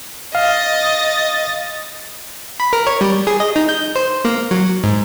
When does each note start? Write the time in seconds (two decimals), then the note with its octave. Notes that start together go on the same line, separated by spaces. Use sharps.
0.35 D#5 F5 A6
2.60 B5
2.73 A#4
2.87 C#5
3.01 G3
3.27 G#4
3.40 D#5
3.56 D#4
3.69 G6
3.96 C5
4.25 A#3
4.51 F#3
4.84 G#2